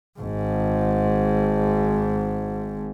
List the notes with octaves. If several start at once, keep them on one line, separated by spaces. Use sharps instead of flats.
G#1 G#2